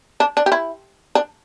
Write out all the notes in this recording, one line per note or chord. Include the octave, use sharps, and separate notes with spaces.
D4
D4
G4
E4
D4